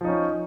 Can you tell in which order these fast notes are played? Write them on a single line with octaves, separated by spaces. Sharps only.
F3 D#4 C#4